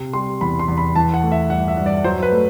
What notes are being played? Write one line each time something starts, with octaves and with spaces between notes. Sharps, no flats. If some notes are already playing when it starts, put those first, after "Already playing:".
Already playing: C3
G3 C6
E2 B5
C6
E2
B5
E3 A5
F#5
A3
E5
G2 F#5
E5
G2
D5
F#3 C5
B4
A3